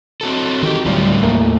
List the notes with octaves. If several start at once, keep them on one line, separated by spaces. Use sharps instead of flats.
C4 F#4 A4
D#3 F#4 G4
D2 A2 F#3 G3 F4
D#2 A3 A#3